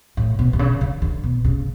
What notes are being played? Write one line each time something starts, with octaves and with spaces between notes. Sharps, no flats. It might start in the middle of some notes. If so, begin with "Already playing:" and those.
A2
B2
B2
C#3
D3
D3
B2
C#3